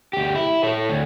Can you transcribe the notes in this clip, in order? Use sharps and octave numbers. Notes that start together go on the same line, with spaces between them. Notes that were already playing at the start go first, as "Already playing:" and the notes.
D2 G4
E4
A4 C#5
D2